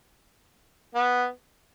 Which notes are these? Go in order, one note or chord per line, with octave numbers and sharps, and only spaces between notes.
B3